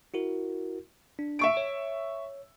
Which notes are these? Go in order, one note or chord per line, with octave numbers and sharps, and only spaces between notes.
E4 F#4 A#4
D4
E5 C#6 D7
C#5